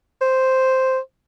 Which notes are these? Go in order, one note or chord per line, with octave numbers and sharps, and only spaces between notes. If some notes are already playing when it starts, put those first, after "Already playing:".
C5